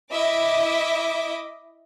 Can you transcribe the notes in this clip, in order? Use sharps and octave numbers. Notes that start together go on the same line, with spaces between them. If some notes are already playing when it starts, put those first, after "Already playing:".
E4 D#5 E5 D6